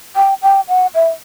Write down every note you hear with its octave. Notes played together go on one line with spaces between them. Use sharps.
G5
G5
F#5
E5